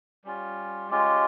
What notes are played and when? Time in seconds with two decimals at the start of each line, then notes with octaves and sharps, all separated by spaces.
0.25 G3 C#4 F4
0.90 G#3 C#4 F4 G4